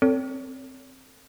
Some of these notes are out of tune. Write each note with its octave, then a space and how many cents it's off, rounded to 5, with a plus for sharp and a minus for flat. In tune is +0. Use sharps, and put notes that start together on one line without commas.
C4 +0 A4 +30 C#5 +35